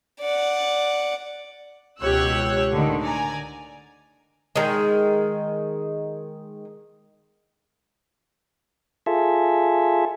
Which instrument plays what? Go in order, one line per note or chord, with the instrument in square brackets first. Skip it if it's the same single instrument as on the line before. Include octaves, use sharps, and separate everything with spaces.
[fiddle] D5 F#5
[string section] C#2 B2 G4 C#5 E6 F#6
A2 D3 D#3
D5 G#5 A#5
[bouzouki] D#3 G#3
[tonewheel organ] F4 G#4 A4 E5